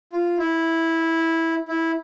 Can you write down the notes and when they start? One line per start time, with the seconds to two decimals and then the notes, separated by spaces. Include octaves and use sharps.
0.13 F4
0.38 E4
1.68 E4